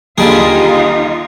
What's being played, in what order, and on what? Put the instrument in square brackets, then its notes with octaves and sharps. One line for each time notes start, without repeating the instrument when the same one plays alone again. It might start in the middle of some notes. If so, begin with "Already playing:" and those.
[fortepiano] D#2 [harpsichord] D3 G3 G#4 [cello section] D#4 F4